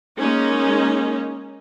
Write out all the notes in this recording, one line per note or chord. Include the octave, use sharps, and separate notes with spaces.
G#3 A#3 C#4 D#4